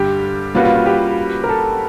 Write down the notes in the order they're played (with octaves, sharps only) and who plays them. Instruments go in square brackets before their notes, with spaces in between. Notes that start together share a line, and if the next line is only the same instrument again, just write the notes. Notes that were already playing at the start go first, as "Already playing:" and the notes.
Already playing: [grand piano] G2 D3 G3 [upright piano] G4
[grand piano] G3 A#3 C#4 F#4 B4 [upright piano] F4
[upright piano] F4
F4
G4
A#4
A4